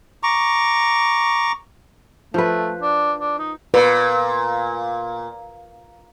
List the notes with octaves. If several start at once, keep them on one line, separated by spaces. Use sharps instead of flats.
A#5 C#6 D6
F3 A3 B4
D4
D4
D#4
A#2 B4